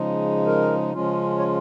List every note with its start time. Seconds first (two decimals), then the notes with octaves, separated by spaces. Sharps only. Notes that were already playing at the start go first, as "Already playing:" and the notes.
Already playing: C#3 F3 G#3 D#4
0.46 A#4
0.93 C#3 F3 G#3 C#4 F4
1.39 C#5